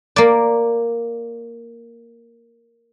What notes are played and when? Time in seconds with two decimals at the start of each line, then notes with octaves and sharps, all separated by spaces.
0.16 A#3 D5